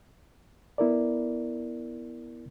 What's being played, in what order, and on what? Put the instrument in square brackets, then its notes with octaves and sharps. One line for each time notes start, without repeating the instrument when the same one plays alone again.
[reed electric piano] B3 E4 A#4 D5